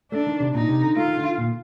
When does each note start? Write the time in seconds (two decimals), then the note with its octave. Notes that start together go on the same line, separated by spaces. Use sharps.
0.12 A3 D4
0.26 D#3
0.40 C3
0.54 A#2 D#4
0.69 C3
0.82 D3
0.96 A3 F4
1.08 D#3
1.17 D3
1.38 A#2